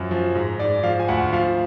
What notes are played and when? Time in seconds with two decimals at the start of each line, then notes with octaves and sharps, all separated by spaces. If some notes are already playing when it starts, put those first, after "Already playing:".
Already playing: F#2 F3
0.11 F3
0.35 G#2
0.59 G#2 D5
0.83 F3 F5
0.99 G#5
1.08 D2 F#5
1.33 F3 F5